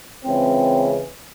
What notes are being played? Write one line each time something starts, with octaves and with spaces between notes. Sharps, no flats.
C#2 C#3 E3 G#3 C4